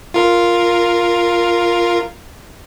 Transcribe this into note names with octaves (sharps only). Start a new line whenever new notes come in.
F4 A#4